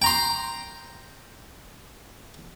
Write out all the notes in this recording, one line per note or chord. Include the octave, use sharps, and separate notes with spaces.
G5 A#5 C6